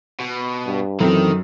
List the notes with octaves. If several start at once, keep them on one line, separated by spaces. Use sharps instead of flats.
B2
G2
F#2 D#3 E3 C4 A4